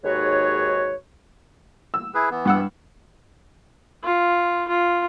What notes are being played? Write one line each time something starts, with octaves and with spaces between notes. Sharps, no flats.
D#2 G#2 F#4 G#4 B4 C#5
E6
E4 G#4 B4
E3 B3
G2 F#5 E6
F4
F4